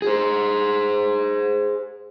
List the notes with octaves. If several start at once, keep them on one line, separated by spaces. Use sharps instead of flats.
G#4 C5